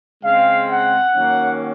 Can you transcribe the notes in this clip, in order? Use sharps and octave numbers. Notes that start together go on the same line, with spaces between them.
C#3 G#3 C4 F5
F#5
D#3 F#3 A#3 C#4